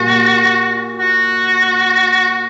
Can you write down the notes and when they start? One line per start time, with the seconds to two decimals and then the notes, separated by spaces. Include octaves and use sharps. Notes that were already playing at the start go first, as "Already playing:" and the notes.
Already playing: A#2 G3 A#3 F#4
1.00 F#4